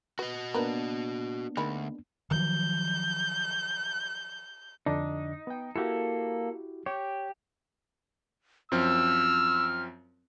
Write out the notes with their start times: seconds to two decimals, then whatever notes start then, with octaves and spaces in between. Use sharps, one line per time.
0.19 B3 F#4 D#5
0.54 A#3 B3 D4 A#4 B4
1.57 D2 D#3 G#3 B5
2.31 D#3 F3 F#3 G6
4.86 F2 D3 D4 D#4
5.47 B3 G5
5.76 A#3 E4 F#4 G4 A4
6.86 G4 C#5
8.72 F#2 F3 C4 E6 F6